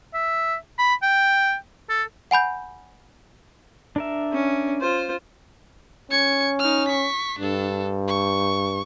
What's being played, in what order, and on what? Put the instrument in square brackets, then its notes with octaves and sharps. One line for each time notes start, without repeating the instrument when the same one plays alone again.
[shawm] E5
B5
G5
A4
[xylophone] F#5 G#5 B5 G6
[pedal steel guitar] D4 A#4 E5
[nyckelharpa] C#4
F4 C5
[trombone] C#4 [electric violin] G#6 C#7
[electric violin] D#4 F6
C#6 B6
[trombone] G2 [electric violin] D4 A4
[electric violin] C#6